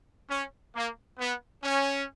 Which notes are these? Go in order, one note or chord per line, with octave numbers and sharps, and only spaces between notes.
C#4
A#3
B3
C#4